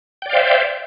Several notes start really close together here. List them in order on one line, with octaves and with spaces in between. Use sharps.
G5 D5 F5 C5 E5